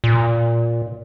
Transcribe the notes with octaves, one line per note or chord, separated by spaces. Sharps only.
A#2